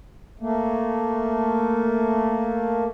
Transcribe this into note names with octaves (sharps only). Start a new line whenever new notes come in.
A3 A#3